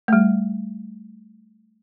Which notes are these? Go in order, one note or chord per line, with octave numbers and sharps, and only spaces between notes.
G3 A3